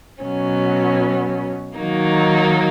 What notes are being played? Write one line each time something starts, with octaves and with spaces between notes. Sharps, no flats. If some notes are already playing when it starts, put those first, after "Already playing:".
B2 F#3 C#4
D#3 F#3 A#3 D#4